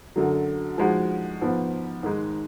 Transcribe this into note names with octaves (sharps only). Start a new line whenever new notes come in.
F#2 D3 F#3
F3 G#3 D#4 F#4
G#2 F3 B3
G#2 D#3 G#3 D#4